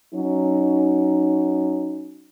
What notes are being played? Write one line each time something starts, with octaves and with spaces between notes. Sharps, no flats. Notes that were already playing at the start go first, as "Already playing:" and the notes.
F#3 C#4 D#4